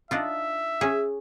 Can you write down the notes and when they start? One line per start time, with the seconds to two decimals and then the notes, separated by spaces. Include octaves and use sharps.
0.11 D4 D#4 F4 E5
0.81 C#4 G#4